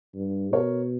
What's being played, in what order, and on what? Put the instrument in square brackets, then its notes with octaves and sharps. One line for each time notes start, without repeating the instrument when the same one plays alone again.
[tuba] G2
[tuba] B2 [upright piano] A#4 C#5